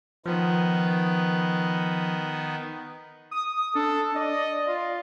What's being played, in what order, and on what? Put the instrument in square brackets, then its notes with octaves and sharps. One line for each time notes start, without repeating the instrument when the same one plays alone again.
[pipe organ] D#3 B3 [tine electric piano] F3
[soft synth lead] D#6
[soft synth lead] D4 [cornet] A4
[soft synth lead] D5 [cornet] D#5
[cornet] F4